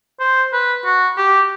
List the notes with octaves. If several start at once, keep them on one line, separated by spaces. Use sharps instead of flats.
C5
B4
F#4
G4